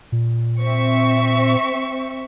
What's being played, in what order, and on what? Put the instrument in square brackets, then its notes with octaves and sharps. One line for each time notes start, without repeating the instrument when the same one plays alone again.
[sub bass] A#2
[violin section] C4 E5 C#6